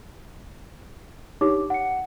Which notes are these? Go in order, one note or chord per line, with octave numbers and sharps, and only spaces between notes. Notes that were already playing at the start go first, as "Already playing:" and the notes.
D4 D#4 G4 C#5 D6
F#5 C#7